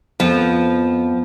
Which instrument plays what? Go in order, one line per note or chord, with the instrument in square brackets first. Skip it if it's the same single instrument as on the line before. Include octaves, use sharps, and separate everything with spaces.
[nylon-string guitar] F2 [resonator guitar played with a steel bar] F3 [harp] B3